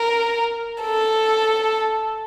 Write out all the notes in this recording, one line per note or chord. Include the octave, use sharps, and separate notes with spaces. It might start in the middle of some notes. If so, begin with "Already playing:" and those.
Already playing: A#4
A4